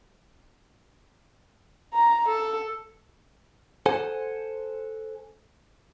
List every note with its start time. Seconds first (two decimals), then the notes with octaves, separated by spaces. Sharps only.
1.94 A#5
2.27 A4
3.86 A4 C5 F#5 G#5